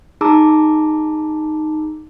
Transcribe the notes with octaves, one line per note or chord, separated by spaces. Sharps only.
D#4 G#4 A5 A#5 D6 E6